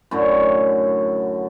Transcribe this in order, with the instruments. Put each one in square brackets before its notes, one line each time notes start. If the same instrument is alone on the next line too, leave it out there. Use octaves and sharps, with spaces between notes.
[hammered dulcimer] F#2 A2 D3 F#3